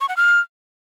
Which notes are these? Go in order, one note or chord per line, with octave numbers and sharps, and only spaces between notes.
C#6
F#5
F6